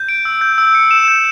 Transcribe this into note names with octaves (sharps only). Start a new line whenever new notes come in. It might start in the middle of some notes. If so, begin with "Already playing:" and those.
Already playing: G6
D7
E6
G6
E6
C#7
E7
G6